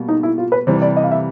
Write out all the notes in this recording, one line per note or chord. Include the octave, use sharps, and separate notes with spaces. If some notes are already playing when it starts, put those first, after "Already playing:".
Already playing: B2 G3 A#3
D#4
E4
F4
B4
C3 E3 G3 C5
D5
D#5
F5
E5